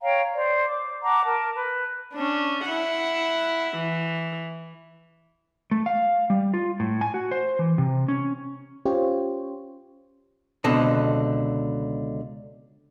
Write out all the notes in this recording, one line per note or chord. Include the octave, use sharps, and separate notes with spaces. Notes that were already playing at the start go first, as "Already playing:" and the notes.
C#5 F5 G5 A#5
C5 D5
D6
F#5 A5 A#5 D6
A#4 A5
B4
C#4 D4
E4 F#5
E3
A3
F5
G3
F4
A2
G#5
F#4
C5
E3
C3
C#4
C#4 F4 G4 C5 C#5
C#2 B2 D3 C4 A4 D#5